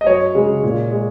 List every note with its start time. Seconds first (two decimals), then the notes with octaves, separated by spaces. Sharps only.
0.01 D#5
0.07 F#2 C#5
0.35 C#3 G#3
0.63 A#2
0.91 G#3